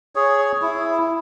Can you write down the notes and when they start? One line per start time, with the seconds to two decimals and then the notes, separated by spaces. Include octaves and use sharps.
0.15 G#4 C#5
0.62 E4